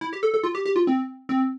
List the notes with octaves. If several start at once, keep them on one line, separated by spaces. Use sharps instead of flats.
E4
G4
A4
A4
F4
G4
G4
F4
C4
C4